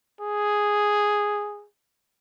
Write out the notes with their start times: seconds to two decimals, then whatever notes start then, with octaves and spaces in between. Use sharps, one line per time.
0.21 G#4